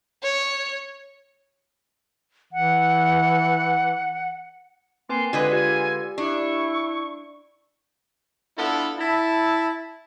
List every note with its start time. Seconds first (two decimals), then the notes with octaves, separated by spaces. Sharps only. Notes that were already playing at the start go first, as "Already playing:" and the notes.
0.23 C#5
2.53 E3 F#5
5.09 A#3 C4 B4 G#5 C6
5.33 D3 G#3 F4 B4 D#5 G#5
5.51 F4 G4 D5 G#5
6.18 D4 E4 C#6
8.57 B3 D4 E4 F4 A4
8.99 E4 A5